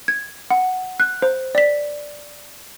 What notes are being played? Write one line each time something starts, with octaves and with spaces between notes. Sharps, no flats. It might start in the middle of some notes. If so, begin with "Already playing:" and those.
G#6
F#5
F#6
C5
D5 B6